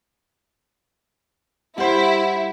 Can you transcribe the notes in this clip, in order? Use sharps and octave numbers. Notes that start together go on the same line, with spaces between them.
G3 E4 C5 F#5